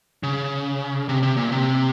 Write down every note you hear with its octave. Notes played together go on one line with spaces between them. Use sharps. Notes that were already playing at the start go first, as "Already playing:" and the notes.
C#3
C3
C3
A#2
C3